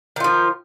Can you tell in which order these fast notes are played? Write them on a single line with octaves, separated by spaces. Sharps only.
D#3 F4 F3